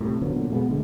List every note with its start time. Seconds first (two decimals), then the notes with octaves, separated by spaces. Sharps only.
0.01 A2 C3
0.22 D3 F3 F#3 B3
0.35 A#2 D3
0.50 B2 G#3 A3 B3
0.69 D1 D2 D3 G#3